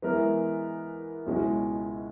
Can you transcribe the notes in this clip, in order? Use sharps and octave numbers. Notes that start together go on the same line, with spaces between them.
E3 G#3 B3 E4 A#4
C#2 B2 G#3 C#4 E4